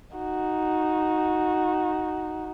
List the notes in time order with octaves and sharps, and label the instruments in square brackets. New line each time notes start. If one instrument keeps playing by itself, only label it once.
[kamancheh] D#4 F#4